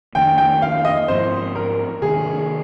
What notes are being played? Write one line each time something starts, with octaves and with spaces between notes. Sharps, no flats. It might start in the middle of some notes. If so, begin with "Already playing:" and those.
F2 D#3 A#3 D4 G5
G5
F5
D#5
G#2 F3 C4 C5
A#4
C3 D#3 A#3 D4 G#4